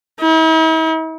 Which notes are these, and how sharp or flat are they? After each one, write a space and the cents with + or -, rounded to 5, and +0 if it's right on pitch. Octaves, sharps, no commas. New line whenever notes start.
E4 -45